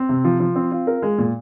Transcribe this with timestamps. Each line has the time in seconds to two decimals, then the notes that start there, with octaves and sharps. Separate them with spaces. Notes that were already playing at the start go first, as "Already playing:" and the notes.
Already playing: C4
0.09 C3
0.24 F3
0.40 F3
0.56 C4
0.71 F4
0.87 A#4
1.02 G#3
1.18 A#2